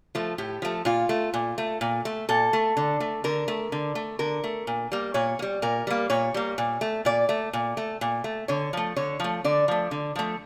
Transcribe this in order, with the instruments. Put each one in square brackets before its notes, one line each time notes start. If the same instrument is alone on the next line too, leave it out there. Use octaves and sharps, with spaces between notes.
[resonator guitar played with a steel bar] F3 A3
A2 G4
F3 A3
A#2 F4
A3
A#2
A3
A#2
A3
A#2 A4
A3
D3
A3
D3 A#4
A3
D3
A3
D3 A#4
A3
A#2
G3 A#3
A#2 C#5
A#3
G3
A#2 A#4
G3 A#3
A#2 C#5
G3 A#3
A#2
A3
A#2 D5
A3
A#2
A3
A#2
A3
D3 C#5
F3 A3
D3 C#5
F3 A3
D3 D5
F3 A3
D3
F3 A3